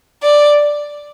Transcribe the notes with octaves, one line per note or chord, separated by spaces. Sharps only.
D5